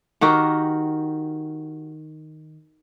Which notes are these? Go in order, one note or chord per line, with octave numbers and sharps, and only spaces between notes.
D#3 F#4 G4 A#4